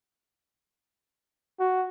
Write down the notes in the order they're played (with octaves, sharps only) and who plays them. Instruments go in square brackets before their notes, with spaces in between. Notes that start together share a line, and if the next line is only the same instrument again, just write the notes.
[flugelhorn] F#4